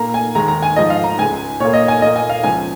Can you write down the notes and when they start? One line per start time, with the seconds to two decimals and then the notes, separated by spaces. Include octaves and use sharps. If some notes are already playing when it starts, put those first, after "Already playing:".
Already playing: A#2 A#3 A#5
0.14 G#5
0.35 D#2 D#3 G#3 A#5
0.48 A#5
0.62 G#5
0.76 G#2 F3 G#3 D#5
0.90 F5
1.04 A#5
1.18 C#2 C#3 G#3 G#5
1.60 A#2 A#3 C#5
1.73 D#5
1.88 G#5
2.01 A#2 A#3 D#5
2.16 G#5
2.30 F5
2.43 C#2 C#3 F3 G#5